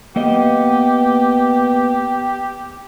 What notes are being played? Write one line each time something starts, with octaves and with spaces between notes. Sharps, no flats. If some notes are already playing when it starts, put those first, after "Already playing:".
A#3 B3 G4 D#5